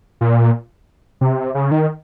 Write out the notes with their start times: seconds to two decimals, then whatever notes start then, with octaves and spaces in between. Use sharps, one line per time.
0.21 A#2
1.21 C3
1.55 C#3
1.71 D#3